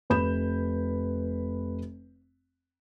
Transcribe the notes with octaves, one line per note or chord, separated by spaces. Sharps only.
F1 B4 B5 G6 E7